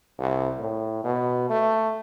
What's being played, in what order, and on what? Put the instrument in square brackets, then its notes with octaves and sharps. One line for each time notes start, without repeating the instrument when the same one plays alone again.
[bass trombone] C2
A2
B2
A3